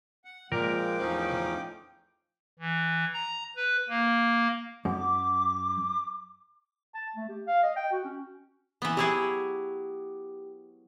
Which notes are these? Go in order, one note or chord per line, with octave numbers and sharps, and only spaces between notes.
F#5
A#2 F3 G#3 A#4 G5 D6
E2 A2 F3 C#4 D#4
E3
A#5
B4
A#3
F#2 D6
A5
A3
G4
F5
D#5
G5
F#4
C#4
E3 B3
F#3 E4 G4 G#4